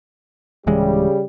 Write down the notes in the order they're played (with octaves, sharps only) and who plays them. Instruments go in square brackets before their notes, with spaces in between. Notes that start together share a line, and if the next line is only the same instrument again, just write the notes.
[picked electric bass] D1 E3 G#3 [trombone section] C#3 G3 G4